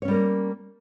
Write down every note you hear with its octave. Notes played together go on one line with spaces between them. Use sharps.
G3 A#3 C#4 A#4 C#5